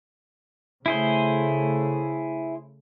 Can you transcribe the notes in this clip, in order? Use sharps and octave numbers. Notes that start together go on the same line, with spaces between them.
C#3 A3 E4 G#4 C5